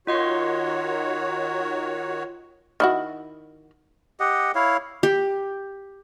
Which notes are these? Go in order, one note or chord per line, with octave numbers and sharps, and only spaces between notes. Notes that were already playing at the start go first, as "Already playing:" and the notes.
D#3 F4 F#4 C#5 D#5 C6
D#3 E4 F#4
G4 D#5 F#5
E4 C#5 F5
G4